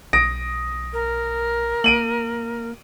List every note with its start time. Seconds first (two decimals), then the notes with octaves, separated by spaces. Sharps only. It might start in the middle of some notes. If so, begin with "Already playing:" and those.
0.13 B1 D#6 A#6 D7
0.93 A#4
1.84 A#3 D7 D#7 F#7